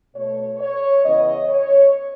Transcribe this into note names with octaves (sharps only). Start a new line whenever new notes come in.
B2 A3 C#5
C#5
C#3 E3 B3 D#5
C#5